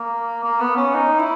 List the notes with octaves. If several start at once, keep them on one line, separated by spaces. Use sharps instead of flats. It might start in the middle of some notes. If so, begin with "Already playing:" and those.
Already playing: A#3
A#3
B3
C#4
D#4
E4